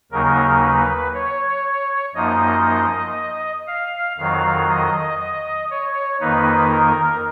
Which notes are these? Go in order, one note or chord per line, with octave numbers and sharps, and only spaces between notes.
D#2 C#3 F#3 A#3 D#4 A#4
B4
C#5
F#2 F3 A#3 D#4 D#5
F5
F2 D#3 F#3 F5
D#5
D#5
C#5
F2 D#3 A#3 D#4 B4
A#4